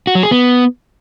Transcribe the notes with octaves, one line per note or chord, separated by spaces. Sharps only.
F#4
F#3
G#4
B3